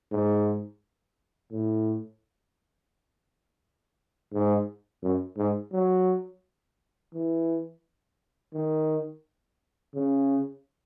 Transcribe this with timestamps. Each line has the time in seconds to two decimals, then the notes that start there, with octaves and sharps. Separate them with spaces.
0.12 G#2
1.52 A2
4.33 G#2
5.02 F#2
5.38 G#2
5.73 F#3
7.14 E3
8.54 D#3
9.95 C#3